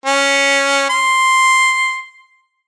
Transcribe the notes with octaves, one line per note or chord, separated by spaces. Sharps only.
C#4
C6